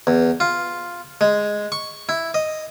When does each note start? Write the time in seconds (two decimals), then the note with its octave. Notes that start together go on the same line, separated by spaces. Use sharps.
0.07 E2
0.40 F4
1.21 G#3
1.72 C#6
2.09 E4
2.34 D#5